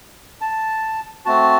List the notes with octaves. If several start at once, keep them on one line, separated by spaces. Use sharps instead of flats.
A5
A3 C4 F#4 A5